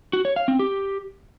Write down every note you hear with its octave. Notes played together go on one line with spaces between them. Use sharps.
F#4
C#5
F5
C4
G4